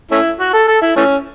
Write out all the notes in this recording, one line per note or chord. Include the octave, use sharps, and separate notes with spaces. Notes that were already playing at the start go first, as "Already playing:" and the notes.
A3 C#4 E4
F#4
A4
A4
E4
E3 A3 C#4